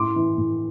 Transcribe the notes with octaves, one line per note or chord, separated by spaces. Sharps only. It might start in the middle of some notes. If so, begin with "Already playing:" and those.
Already playing: A2 C6 D6
E3
A2